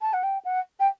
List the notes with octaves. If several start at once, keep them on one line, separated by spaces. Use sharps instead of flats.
A5
F#5
G5
F#5
G5